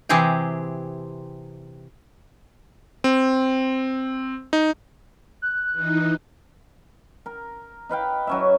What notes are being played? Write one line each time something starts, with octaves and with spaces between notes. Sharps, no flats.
C3 E3 C4 G4 G#4 G5
C4
D#4
F#6
E3 D#4
A#4
D#4 B4 F5 G5
F#3 C#4 E5